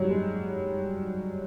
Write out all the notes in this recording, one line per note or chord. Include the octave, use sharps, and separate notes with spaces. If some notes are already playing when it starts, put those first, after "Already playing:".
Already playing: F#3 G3
G#3